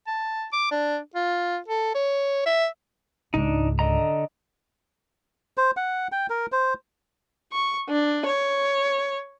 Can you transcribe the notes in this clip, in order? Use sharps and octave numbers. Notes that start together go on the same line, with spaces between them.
A5
D6
D4
F4
A4
C#5
E5
C#2 G#2 D4 D#4
D3 D#5 A#5
C5
F#5
G5
A#4
C5
C#6
D4
C#5